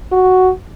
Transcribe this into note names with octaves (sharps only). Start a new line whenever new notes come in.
F#4